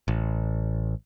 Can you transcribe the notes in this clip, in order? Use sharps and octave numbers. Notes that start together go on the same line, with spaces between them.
A1